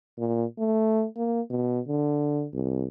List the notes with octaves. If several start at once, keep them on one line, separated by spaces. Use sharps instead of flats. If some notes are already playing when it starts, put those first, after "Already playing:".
A#2
A3
A#3
B2
D3
C2